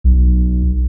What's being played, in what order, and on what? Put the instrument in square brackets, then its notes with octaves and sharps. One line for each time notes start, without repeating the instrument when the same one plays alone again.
[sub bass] B1